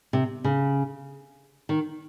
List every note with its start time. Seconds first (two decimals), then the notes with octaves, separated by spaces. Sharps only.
0.13 C3
0.44 C#3
1.69 D#3